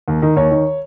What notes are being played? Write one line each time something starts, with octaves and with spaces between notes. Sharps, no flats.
D#2
D#3
D#2 C#5
D#3